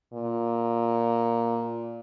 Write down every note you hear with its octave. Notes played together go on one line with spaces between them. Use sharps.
A#2